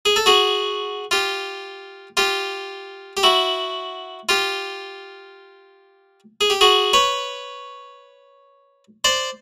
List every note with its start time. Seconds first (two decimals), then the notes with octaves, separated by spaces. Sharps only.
0.05 G#4
0.16 A4
0.26 F#4 G#4
1.11 F4 G4
2.17 F4 G4
3.17 G4
3.23 E4 F#4
4.29 F4 G4
6.41 G#4
6.50 G4
6.61 F#4 G#4
6.93 B4 C#5
9.04 C5 D5